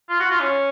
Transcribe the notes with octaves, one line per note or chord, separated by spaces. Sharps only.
F4
F#4
F4
C#4